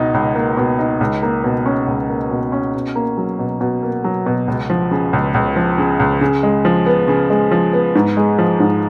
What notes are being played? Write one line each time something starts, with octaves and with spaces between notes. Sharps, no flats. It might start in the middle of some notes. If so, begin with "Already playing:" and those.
Already playing: C#2 B2 D#4
C#2
A#3
B2
D#4
C#2
A#3
B2
C#4
C#2
A#3
B2
C#4
B2
A#3
F#3
B2
B2
A#3
F#3
B2
C#2
F3
C#3
C#2
C#2
F3
C#3
C#2
C#3
G#3
F3
B3
C#3
G#3
F3
B3
G#2
G#3
F3
G#2